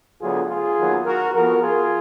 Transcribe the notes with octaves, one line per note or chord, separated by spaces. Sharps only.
D2 D3 F#3 B3 F4 G#4
F4 G#4
D#2 D#3 F#3 B3
F#4 A#4
F2 F3 B3 F#4 A#4
F4 G#4